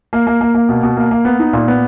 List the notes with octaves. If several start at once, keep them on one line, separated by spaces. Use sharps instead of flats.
A#3
A#3
A#3
A#3
B2
B2
A#3
A#3
B3
D#4
A#2
B3